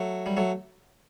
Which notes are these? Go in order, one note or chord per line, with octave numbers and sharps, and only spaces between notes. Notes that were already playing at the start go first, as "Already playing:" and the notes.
Already playing: F#3 A3
G3
F#3 A3